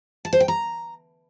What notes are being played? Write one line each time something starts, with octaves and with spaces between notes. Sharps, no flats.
A5
C5
G5
A#5